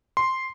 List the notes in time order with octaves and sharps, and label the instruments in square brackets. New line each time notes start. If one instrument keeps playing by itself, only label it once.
[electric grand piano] C6